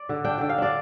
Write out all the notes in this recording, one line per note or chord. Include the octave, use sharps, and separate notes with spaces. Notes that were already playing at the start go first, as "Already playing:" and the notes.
Already playing: D5
D3
D4 G5
D3 G5
F5
D4 D5